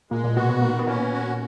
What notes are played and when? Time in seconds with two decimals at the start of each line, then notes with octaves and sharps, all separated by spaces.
0.11 A#2 G#3 A#3
0.24 A#2 A#3
0.36 B2 B3 F#4
0.49 B2 B3
0.61 A#2 D#3 A#3
0.79 B3
0.87 A#2 A#3 C#4
1.13 F#4